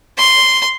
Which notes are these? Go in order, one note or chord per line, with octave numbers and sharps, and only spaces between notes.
C6